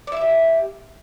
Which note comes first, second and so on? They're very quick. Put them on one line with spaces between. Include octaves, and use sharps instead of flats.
D5 E4 E5 G4